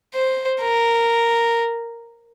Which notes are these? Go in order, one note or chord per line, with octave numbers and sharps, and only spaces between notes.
C5
A#4